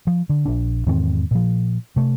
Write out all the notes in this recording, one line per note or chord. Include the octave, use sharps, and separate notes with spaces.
F3
D3
A#1 D4
E2 G#2 D#3 C4
A#2 F3
C3 A3